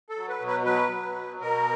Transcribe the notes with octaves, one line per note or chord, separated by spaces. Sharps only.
A4
F#3
B4
B2
B4
F#3 B4
F#3
B2
B2 A#4